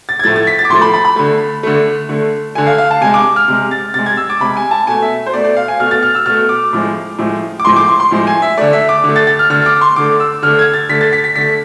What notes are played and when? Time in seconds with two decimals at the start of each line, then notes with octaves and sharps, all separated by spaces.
0.09 A6
0.19 G#6
0.24 A2 F3 A3 A6
0.36 A6
0.47 B6
0.59 A6
0.65 D6
0.69 A2 F3 A3 C6
0.82 B5
0.94 B5
1.05 B5
1.16 D3 A3
1.63 D3 A3
2.09 D3 A3
2.55 D3 A3 G#5
2.67 F5
2.78 F5
2.91 A5
3.01 C3 G#3 G#5
3.14 D6
3.36 F6
3.48 C3 G#3
3.71 A6
3.94 C3 A6
3.99 G#3
4.06 G#6
4.17 E6
4.30 D6
4.40 C3 G#3 B5
4.57 G#5
4.71 A5
4.87 B2 A3 G#5
5.02 E5
5.26 C5
5.33 B2 A3 D5
5.44 D5
5.57 F5
5.68 G#5
5.80 B2 A3 F6
5.91 A6
6.03 F6
6.15 E6
6.26 B2 A3 F6
6.49 D6
6.73 A2 F3 G#3
7.18 A2 F3 G#3
7.60 D6
7.65 A2 F3 G#3 C6
7.76 D6
7.88 C6
8.00 C6
8.11 A2 F3 G#3
8.27 G#5
8.42 E5
8.58 D3 A3 D5
8.73 E5
8.89 D6
9.04 D3 A3
9.16 A6
9.27 A6
9.39 F6
9.50 D3 A3 F6
9.66 D6
9.81 C6
9.96 D3 A3 D6
10.20 E6
10.43 D3 A3 F6
10.59 G#6
10.74 A6
10.89 D3 A3 B6
11.01 A6
11.13 B6
11.24 B6
11.36 D3 A3 B6